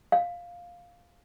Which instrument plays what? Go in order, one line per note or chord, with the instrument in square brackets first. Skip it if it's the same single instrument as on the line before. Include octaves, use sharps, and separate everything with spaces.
[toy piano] F5